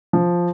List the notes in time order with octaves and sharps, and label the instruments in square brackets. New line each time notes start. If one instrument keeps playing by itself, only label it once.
[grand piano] F3